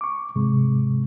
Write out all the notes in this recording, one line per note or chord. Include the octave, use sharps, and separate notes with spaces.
C#6 D6
G#2 C3 G#3